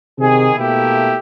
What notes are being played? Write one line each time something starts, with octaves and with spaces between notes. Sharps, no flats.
C3 D#3 G#4
B2 A3 A#3 E4 G4